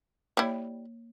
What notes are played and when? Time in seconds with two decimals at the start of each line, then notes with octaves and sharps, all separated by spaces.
0.37 G3 A#3 E4 C#5